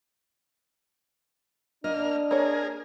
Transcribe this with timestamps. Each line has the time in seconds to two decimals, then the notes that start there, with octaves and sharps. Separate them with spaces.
1.84 A#3 D4 D#5 F6
2.31 A#3 G#4 A#4 C#5